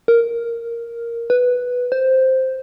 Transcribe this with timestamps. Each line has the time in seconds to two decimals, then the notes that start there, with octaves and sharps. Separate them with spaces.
0.08 A#4
1.30 B4
1.92 C5